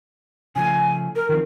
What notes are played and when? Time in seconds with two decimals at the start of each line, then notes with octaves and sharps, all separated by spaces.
0.56 C#3 F3 A3 G#5
1.16 A#4
1.29 D#3 F3 C4